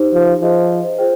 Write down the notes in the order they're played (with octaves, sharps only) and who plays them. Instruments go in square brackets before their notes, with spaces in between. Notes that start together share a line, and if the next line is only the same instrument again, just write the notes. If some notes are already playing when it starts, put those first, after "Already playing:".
Already playing: [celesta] D#4 G4 C5
[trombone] F3
[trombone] F3 [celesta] G#4 C5 D#5
[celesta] F4 G#4 C5 G5